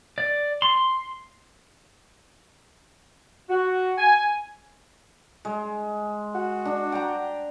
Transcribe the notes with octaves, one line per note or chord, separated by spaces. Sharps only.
D5
C6
F#4
G#5
G#3
F#4
D4
G5 A#5